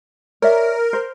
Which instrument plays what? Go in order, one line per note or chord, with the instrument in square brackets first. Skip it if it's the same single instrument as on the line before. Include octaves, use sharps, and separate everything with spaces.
[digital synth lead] A#4 [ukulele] C#5 D5 E5
[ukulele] C5